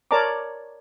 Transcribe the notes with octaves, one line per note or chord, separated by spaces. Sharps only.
A#4 C#5 D5 A5 A#5 D6